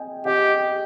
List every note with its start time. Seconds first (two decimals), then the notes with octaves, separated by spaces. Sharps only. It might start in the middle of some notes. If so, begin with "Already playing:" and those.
Already playing: D#5 G5 G#5
0.25 G4 D#5 G5